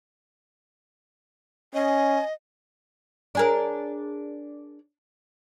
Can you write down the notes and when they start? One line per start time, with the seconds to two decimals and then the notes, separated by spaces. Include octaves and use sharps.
1.74 C#4 D#5 G#5
3.35 D4 G#4 A#4